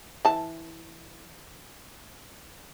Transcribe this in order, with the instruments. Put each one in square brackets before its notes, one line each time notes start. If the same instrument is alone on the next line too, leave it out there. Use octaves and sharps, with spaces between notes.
[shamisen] E3 A5